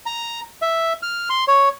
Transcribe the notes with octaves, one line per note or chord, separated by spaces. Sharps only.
A#5
E5
F6
C6
C#5